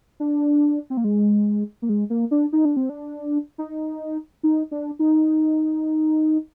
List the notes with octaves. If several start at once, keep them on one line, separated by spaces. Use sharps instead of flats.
D4
C4
A#3
G#3
A#3
G#3
A#3
D4
D#4
D4
C4
D4
D#4
D#4
D4
D#4